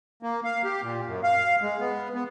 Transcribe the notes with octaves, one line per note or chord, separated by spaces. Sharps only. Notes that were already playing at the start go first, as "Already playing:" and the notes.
A#3
F5
G4
A#2
F#2
F5
G#3
B3
B3